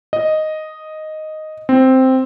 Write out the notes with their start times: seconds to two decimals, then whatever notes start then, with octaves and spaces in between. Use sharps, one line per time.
0.13 D#5
1.69 C4